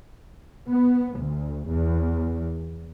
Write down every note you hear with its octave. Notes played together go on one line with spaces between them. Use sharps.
B3
D2
E2